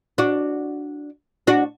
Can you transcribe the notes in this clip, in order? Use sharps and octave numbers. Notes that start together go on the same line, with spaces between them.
D4 F#4
D4 F#4